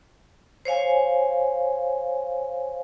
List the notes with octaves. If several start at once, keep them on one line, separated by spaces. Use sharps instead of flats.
C5 C#5 F5 G#5